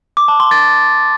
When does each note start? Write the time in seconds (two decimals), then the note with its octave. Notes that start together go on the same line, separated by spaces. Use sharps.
0.17 D6
0.28 A5
0.40 C6
0.51 A6